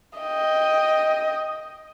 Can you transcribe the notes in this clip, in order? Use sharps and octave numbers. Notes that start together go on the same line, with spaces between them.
D#5 G5